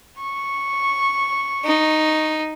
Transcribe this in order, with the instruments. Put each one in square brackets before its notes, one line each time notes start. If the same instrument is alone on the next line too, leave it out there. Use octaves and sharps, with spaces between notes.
[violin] C#6
[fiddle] D#4